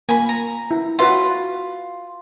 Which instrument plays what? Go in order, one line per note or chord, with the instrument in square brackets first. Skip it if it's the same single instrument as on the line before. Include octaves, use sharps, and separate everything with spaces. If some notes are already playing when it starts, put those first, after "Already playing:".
[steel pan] A#3 [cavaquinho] G#5 B5
[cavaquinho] A#5
[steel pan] E4
[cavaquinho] F4 [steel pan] F#4 B4 E5